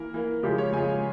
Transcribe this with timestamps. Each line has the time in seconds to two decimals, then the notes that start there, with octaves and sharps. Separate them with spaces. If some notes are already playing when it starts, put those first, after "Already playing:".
Already playing: E3 A#3 A#4
0.14 E3 A#3
0.43 C#3 F3 G#3 G4
0.58 C#5
0.73 C#3 F3 G#3 G#5